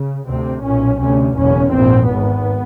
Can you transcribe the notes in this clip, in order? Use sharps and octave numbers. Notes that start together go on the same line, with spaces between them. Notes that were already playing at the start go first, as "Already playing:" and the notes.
Already playing: C#3
D2 C3 C4
B1 A#2 C#4
D2 C3 C#4
F#1 E2 B2 C#4
A#1 G#2 C4
G#1 G#2 B3